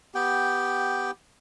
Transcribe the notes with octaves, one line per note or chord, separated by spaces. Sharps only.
B3 G4 G5